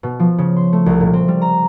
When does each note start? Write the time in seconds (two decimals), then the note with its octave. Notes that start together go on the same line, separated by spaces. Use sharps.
0.03 B2
0.20 F3
0.38 C#3
0.56 C6
0.73 A3
0.86 C2
1.00 A#2
1.13 C4
1.28 G3
1.42 A#5